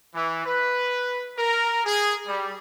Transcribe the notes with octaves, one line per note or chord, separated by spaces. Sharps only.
E3
B4
A#4
G#4
G3